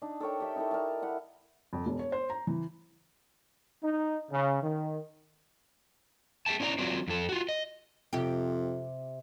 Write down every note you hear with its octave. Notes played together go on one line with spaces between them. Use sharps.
D4 D#4
A4 A#4 C#5 G5
G4 E5
D#4 E4 A4 A#4
A#4 D5 A5
E4 F#5
F2
E1
C#5
C5
A#5
E3
D#4
C#3
D#3
G#4 B4 E5 G5 A5
C#4 E4 D5 F#5 A#5
F#3 C4 F4 D5
F2 A4
F4 F#4
D#5
F2 C3 G4